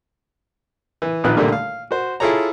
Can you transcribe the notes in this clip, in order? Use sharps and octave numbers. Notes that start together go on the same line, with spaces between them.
E3
A#1 A#2 D#3 F4 B4 F#6
A#2 D3 G3 A3 A#3
F5
F#4 C5
E4 F4 G#4 A4 C#5 A#5